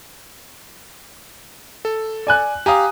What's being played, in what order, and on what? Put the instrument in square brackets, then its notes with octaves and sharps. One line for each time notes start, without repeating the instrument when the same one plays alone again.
[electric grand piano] A4
[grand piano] D5 G#5 F#6
[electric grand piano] G4 F5 [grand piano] G#5 A#5 D#6